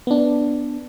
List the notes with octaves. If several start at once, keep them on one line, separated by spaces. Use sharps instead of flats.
B3 D4